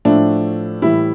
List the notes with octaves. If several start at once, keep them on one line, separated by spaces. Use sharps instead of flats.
A2 F3 A3 D4
A2 E3 G3 E4